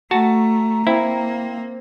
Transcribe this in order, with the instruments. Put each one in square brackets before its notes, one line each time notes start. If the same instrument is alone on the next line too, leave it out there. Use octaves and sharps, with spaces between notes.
[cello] A3 [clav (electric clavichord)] F#4 A5 [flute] A#5
[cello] A#3 [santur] C4 [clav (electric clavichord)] E4